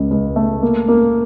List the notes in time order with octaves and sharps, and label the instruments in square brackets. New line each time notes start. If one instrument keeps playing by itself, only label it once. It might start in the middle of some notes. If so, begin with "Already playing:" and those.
Already playing: [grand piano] C#2 C#3
C#2
A3
A#3
A#3